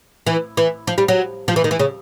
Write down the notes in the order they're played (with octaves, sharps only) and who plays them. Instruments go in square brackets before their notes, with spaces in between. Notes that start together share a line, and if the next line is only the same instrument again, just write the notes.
[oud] E3
E3
F3
G3
F#3
F3
E3
D#3
E3
C#3